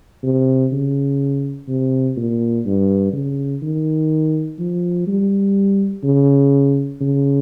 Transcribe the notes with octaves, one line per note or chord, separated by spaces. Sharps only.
C3
C#3
C3
A#2
G2
C#3
D#3
F3
G3
C#3
C#3